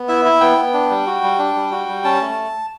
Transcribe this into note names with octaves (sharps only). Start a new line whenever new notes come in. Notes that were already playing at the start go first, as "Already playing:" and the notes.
Already playing: B3
E4 E5
E4
B3 G5
B3
D4
G3
F#4
G3
D4
G3
F#4
G3
C#4 A5
A3